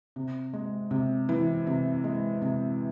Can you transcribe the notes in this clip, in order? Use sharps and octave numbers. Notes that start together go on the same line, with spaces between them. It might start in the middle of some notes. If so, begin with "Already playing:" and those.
C3
G#3
C3
E3
C3
G#3
C3